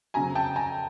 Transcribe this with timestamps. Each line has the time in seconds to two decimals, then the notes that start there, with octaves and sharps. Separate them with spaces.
0.14 F2 C#3 F#3 G#5 A#5
0.35 G5 A5
0.56 G#5 A#5